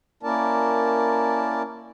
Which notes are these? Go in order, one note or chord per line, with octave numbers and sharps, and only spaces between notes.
A#3 C#4 E4 A#4 D5 A5